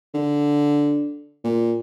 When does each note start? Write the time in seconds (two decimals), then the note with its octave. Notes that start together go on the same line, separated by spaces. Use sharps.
0.14 D3
1.44 A#2